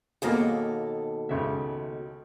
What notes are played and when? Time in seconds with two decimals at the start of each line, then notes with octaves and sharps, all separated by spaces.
0.22 D#2 B2 A#3 G#4 A4
1.29 C#2 C#3 E5